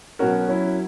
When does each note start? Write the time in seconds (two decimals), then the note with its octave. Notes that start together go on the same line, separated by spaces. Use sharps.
0.19 B2 F#3 C#4 F#4 A#4
0.48 F#3 C#4 E4